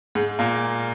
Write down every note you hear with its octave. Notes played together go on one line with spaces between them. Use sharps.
G#2 G#3
A#2 A#3